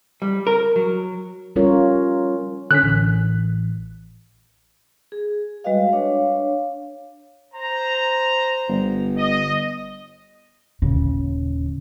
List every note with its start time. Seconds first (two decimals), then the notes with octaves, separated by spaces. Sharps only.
0.22 G3
0.47 A#4
0.76 F#3
1.56 G3 C#4 F4 A#4 C#5
2.71 D3 C#4 F#6 B6
2.83 A1
5.12 G#4
5.64 G3 G#3 F#4 B4 D#5 F5
5.93 D4 C#5 F5
7.54 C5 A#5
8.68 G1
9.17 D#5
10.82 D#1 C#3